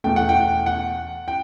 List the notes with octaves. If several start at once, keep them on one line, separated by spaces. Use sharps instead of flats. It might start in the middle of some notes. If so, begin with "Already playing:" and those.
E2 B2 A3 G5
F#5
G5
F#5
G5